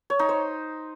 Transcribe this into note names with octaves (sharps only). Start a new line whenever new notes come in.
C#5
D#4
C5